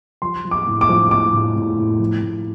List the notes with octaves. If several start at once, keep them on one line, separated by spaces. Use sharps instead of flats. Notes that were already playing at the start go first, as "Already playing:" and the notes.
F3 C6
F3
D6
A2
D6
F3
A2 D6
A2
A2
A2
F3
A2